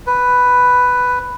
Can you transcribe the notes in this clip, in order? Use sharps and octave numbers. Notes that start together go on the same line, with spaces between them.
B4